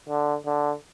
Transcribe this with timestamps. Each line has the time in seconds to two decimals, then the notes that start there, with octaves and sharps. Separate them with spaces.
0.09 D3
0.46 D3